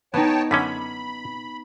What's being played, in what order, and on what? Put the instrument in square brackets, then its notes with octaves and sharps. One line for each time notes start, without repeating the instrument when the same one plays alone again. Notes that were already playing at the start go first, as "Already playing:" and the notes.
[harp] B3 D#4 [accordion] C#5 G5 A5
[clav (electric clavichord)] F#2 D3 C#4 [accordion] B5 [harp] B6